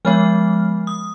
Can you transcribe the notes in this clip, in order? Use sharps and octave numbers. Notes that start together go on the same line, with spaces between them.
F3 G#3 B3 F6
D#6